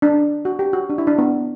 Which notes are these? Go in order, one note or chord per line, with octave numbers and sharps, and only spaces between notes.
D4
F#4
G4
F#4
D4
E4
D4
B3